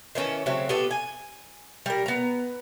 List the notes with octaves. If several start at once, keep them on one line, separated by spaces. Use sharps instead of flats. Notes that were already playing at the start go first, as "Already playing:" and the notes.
D#3 E3 C#4 A4
C#3 F#3 A3 C4
B3 F4 G4 A4
G#5
G3 A#4
B3 A#5